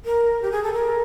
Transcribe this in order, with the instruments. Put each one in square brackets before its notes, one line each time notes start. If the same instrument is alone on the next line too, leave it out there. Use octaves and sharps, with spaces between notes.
[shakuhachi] A#4
G4
G#4
A4
A#4